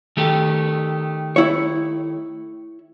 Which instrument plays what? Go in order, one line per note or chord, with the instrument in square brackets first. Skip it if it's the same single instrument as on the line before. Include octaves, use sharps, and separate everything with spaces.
[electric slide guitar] D#3 A3 G4
[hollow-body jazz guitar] E4 C#5